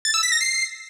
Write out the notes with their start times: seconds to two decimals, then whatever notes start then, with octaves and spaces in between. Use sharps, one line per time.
0.05 A6
0.14 E6
0.23 B6
0.32 A#6
0.41 C7